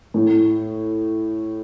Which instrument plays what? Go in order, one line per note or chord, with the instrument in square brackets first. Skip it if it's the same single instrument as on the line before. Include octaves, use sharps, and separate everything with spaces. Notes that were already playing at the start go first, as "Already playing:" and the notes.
[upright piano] A2